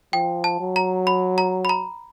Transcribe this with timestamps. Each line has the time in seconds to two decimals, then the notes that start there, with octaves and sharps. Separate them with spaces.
0.13 F3 G5
0.44 A5
0.60 F#3
0.76 A#5
1.07 B5
1.38 A#5
1.65 B5
1.69 A#5